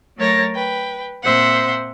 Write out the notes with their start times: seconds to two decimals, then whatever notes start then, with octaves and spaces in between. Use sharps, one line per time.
0.17 F#3 A3 A#4 C#5 A6 A#6
0.53 B4 G5
1.23 A#2 C4 C5 E5 F#5 C6